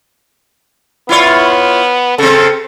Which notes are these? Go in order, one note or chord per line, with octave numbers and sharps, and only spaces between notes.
B3 E4 F4 C#5
C#3 C4 A4